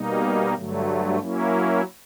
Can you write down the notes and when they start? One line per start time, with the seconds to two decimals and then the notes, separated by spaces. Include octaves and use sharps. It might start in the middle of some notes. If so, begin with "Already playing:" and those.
Already playing: B2 G3 A#3 D#4
0.55 G2 D3 F#3 A3
1.19 F#3 A#3 C#4 E4